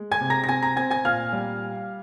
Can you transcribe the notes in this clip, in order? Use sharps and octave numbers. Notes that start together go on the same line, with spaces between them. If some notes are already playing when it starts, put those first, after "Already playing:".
Already playing: G#3
G#5 G#6
C3
A#5 A#6
A#6
C4 G#5 G#6
A#5 A#6
C4 G#5 G#6
G#5 G#6
A#2 F5 F6
G3